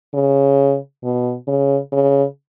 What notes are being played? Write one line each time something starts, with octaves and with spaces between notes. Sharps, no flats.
C#3
B2
C#3
C#3